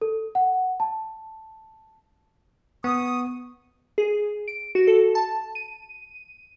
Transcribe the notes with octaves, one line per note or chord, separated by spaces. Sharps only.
A4
F#5
A5
B3 C#6 D#6
G#4
D7
F#4
A4
A5
D#7